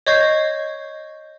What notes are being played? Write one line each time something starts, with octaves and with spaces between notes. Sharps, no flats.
C#5 D#5 C#6 G6 G#6 C7